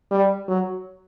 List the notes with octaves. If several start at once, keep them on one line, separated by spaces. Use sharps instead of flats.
G3
F#3